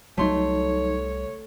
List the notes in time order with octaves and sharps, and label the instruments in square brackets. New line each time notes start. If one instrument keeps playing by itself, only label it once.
[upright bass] C2 [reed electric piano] F#3 D#4 [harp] A3 C6 [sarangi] C#5